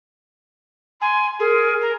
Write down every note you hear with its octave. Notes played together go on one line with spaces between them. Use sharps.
G#5 C6
G#4 A#4
A#4